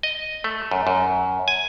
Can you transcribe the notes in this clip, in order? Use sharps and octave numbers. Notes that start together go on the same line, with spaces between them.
D#5
A3
F#2
F#2
G#5